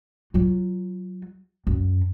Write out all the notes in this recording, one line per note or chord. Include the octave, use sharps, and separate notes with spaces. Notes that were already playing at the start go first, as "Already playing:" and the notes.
F#3 F4
F#2